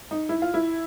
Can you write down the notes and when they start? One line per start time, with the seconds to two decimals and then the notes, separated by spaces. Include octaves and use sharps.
0.11 D#4
0.29 E4
0.42 F4
0.54 E4